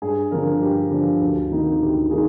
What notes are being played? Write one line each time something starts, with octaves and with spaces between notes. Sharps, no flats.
G2 G#4
D3 F3 A#4
G2 G4
D3 F3
D2
C3 D#3 A#3 D#4
D2 G4
C3 D#3 A#3 D#4 G#4